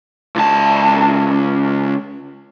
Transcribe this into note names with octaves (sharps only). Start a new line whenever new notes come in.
C#2 A5